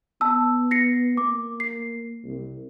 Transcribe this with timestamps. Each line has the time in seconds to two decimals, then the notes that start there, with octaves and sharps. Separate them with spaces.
0.21 B3 A5 E6
0.71 A#6 C7 C#7
1.17 A#3 D6
1.60 C7
2.24 C2